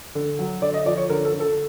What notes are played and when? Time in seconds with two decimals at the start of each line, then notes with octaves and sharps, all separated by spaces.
0.15 D3
0.39 F#3
0.62 D3 D5
0.74 D#5
0.86 F3 D5
0.97 C#5
1.10 D3 A#4
1.25 A4
1.33 D3
1.40 A4